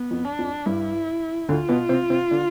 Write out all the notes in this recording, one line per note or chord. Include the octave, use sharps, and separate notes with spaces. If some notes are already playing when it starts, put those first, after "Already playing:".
Already playing: B3
F2 F3
D4
F2 F3
G2 G3 E4
D2 D3 F4
B2 B3
C3 C4
C3 C4
D3 D4